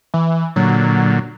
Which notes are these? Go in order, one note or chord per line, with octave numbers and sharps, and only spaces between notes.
E3
A#2 D3 F#3